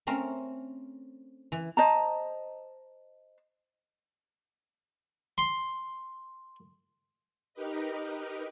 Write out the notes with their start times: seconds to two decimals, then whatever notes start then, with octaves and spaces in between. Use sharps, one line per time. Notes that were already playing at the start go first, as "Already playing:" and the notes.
0.07 A3 C4 C#4 A#4
1.52 E3
1.77 C5 D#5 A5 A#5
5.38 C6
7.54 D#4 G4 A#4 B4 D#5